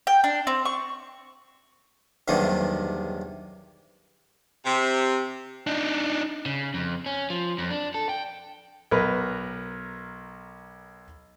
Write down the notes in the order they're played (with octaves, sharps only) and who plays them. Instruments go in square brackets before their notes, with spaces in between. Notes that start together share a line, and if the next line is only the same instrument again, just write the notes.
[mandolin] G5
D4
C4
C#6
[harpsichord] B1 E2 G2 C3 D#3 A#3
[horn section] C3
[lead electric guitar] D4 D#4
[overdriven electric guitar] C#3
F2
C#4
F3
F2
D4
A4
G5
[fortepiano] B1 A#4 B4